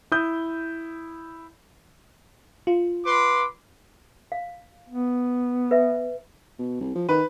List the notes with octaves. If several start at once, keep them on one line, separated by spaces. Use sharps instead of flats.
E4 D#6 G6
F4
B4 C6 D6
F5
B3
B4 E5
B2
C2
F3
D#3 B4